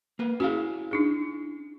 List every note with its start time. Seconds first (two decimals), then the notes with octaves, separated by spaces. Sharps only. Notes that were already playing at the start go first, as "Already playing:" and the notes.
0.19 A#3 B4
0.40 C#4 E4 F#4 G#4 F5
0.91 D4 D#4 G#4